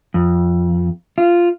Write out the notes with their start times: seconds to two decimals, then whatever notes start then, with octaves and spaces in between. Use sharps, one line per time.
0.14 F2
1.18 F4